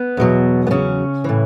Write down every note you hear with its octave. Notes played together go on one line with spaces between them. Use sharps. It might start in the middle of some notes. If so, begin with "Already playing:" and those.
Already playing: B3
E2 B2 F#3
B3
C#3 C#4
A2 E3